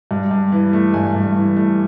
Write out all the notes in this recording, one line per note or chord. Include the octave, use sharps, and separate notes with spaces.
G2
G2
E3
A3
G2 G#5
G2
E3
A3